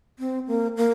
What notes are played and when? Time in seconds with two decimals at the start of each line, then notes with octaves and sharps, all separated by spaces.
0.19 C4
0.47 A#3
0.77 A#3